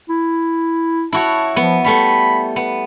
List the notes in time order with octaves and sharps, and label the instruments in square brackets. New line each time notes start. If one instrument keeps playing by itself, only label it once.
[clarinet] E4
[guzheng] E4 F#4 C#5 [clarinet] A5
[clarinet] F3 [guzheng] B3
[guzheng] G3 A3 B3 [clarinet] B5
[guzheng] B3